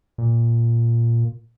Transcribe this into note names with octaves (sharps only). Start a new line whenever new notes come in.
A#2